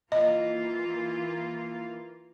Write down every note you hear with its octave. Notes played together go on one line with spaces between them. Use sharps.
E3 A#3 F4 D#5